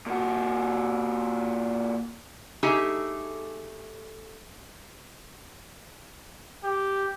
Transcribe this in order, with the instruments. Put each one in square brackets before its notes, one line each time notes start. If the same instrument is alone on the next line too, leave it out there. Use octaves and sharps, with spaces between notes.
[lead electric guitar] A#2 F#4
[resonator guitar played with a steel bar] A3 D#4 G4 G#4 G#5
[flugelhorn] G4